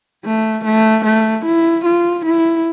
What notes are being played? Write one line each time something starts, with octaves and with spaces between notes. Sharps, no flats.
A3
A3
A3
E4
F4
E4